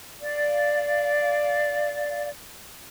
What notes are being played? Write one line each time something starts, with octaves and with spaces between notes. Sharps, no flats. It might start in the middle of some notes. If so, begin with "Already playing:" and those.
D5 F5